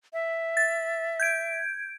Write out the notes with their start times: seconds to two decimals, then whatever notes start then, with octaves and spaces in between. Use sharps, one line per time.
0.13 E5
0.57 A6
1.20 G6 G#6 D7